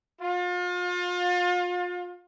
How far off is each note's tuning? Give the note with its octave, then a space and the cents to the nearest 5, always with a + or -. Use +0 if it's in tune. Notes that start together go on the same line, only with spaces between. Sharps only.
F4 +35